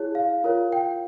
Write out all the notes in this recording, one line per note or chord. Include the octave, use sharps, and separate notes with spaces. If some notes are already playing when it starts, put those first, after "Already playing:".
Already playing: E4 G#4 C#5
F5
F4 A#4 C#5
G5